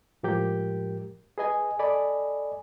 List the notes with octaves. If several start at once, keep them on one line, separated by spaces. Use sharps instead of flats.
A2 F3 G#3 G4 A#4 G6
G#4 B4 D#5 G#5
A4 D5 D#5 G#5 B5